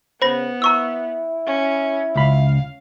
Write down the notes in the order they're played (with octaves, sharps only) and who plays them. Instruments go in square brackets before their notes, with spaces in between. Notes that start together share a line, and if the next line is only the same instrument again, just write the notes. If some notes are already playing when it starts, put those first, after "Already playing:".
[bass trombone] C#3 [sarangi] B3 [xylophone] C5 B5 A#6
[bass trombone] E4 [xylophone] A#5 C#6 E6
[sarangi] C#4
[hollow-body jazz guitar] C#2 B5 [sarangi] F5